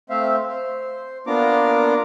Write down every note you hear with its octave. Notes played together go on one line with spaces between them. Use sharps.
A3 C4 C5 E5 F5
C5
A#3 B3 D4 F4 A#5 D6